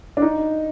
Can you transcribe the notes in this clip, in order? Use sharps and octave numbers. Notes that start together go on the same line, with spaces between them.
D4
D#4